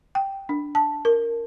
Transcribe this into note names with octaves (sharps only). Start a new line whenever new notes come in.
G5
D4
A5
A#4